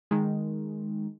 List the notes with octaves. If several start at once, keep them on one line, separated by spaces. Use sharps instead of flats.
D#3 G#3